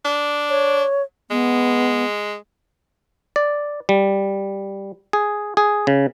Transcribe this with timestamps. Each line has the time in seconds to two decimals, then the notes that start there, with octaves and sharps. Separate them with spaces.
0.05 D4
0.50 C#5
1.31 G#3 B3
3.36 D5
3.89 G3
5.13 G#4
5.57 G#4
5.87 C#3